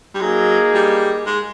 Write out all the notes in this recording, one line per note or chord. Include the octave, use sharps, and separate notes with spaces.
G3
F#3 A#3 D#4 G#4
G3
G#3